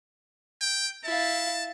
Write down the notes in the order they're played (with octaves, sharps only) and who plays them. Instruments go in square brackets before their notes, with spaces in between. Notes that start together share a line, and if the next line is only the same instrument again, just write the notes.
[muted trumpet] G5
[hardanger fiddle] E4 F5 [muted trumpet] A5